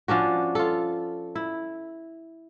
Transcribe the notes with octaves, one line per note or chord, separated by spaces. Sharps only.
F3 C#4 D4 F#4
F4 A4
E4